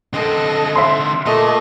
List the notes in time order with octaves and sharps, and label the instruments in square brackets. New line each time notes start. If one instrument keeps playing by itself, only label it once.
[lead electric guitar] D3 C4 [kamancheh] A4 D#5
[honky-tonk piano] E5 C6
[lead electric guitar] A#2 [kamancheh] A3 D#5